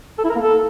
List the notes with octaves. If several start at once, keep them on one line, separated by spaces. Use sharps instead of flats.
A4
E4
A#4
A#3
A4